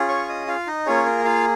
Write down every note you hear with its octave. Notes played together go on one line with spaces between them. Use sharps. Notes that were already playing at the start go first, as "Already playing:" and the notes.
Already playing: C#4 F4 G#4
C#5 C#6
D#5 D#6
F4 F5
D#4 D#5
A#3 C#4 F4 G#4 C#5
A#4
F4 F5